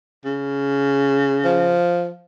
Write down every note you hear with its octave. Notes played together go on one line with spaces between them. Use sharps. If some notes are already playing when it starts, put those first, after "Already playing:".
C#3
F3